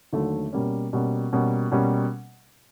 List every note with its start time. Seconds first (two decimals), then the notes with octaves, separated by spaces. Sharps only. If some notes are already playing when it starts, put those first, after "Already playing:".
0.13 D#2 D3 F#3 A3
0.53 B2 G3 A#3 C#4
0.93 B2 G3 A#3 C#4
1.32 B2 G3 A#3 C#4
1.72 B2 G3 A#3 C#4